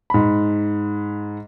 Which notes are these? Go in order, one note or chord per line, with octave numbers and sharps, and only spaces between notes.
G#2 B5